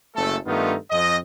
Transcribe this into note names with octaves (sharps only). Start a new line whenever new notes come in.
F#1 A3 A4
G2 D#3 A3 B3 D#4 F4
F2 D#5